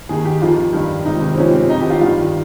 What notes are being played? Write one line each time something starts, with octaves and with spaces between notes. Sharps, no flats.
D#2 D#3 G#4
G4
F2 D#3 F4
G2 D#3
C#2 C3 D#3 D#4
C4
C#2 C3 F3 C#4
C4
F2 D#3 D#4
G4
F4
G2 D#3 F4